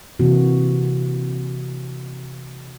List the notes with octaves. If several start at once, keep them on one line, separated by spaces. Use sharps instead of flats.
C3 E3 A#3 F#4